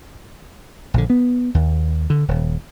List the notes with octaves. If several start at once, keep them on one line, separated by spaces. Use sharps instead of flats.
A#1 D3
B3
D#2
D3
D#1